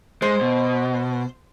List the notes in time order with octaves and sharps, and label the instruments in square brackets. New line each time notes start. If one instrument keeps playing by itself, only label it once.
[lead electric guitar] G#3 [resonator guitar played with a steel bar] C5
[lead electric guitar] B2